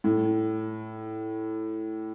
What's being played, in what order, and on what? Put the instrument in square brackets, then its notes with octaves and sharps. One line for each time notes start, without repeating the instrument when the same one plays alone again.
[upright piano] A2